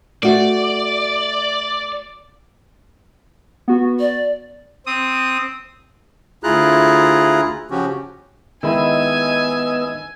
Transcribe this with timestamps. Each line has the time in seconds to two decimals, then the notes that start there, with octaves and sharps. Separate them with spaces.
0.23 A3 F#4 D5
3.68 B3 F#4
4.00 D5
4.86 C4 D#6
6.44 D2 E4 F4 G#4 A#5 F#6
7.71 C#3 F3 C#4 F#4 G4
8.63 D#3 G#3 B3 E4 D#5 G#5 E6